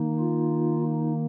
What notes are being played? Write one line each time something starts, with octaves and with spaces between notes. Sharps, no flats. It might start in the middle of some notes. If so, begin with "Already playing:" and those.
Already playing: D#3 A#3 D#4
F4
D#4